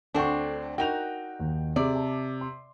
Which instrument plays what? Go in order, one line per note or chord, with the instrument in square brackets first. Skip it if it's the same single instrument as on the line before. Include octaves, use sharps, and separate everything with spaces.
[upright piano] D2 [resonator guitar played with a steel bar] C4 D4 [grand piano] A4 F#5 C#6
[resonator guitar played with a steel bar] D#4 F#4 [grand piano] A#4 [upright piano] G5 F7
[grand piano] D#2
[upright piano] C3 [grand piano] G#4 [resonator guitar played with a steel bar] D5
[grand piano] A5
C6